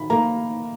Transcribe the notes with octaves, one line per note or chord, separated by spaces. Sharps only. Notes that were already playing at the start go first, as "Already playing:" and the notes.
Already playing: D#3 B5
A#3 A#5